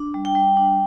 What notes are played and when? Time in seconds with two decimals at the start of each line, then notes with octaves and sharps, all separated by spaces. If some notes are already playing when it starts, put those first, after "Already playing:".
Already playing: D4
0.14 G3
0.25 G5
0.35 G3
0.57 D4